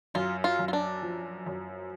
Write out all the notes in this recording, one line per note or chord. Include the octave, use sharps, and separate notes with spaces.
F#2 F4
F4
F#2
F4
D4
F3
F#2